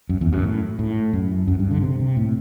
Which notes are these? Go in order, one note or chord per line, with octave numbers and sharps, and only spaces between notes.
F#2
E2
F#2
B2
A2
A2
F#2
F#2
G2
D3
C3
C3
A2